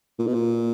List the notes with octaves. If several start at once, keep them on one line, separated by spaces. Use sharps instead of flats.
A#2
B2
A#2